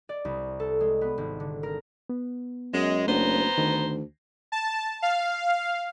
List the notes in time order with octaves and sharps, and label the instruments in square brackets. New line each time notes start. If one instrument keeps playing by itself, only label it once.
[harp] D5
C2
A4
G#3
B3
G#1
D3
A#4
[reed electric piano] B3
[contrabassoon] F#2 [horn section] G#3
[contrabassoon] F#1 [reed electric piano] A3 D4 F#4 [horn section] B3 C5 A#5
[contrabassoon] D2 [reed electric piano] D#3
[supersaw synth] A5
F5